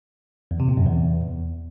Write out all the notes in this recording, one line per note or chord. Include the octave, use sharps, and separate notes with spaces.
E2
C3
A#2
F#2
E2